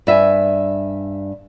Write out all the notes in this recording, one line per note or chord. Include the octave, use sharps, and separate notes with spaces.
G2 E5 G5 G#5